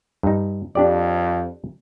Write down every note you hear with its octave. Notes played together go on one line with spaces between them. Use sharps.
G2 D#4
F2 D4 G4 D5